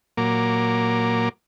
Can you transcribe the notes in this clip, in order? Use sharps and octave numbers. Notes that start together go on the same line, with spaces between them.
A#2 F#3 A#3 D6